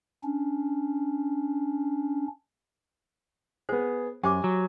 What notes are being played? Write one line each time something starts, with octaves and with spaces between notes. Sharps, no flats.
C#4 D4
B3 G#4 C5
F#2 G4 C5 G#5 D6
F#3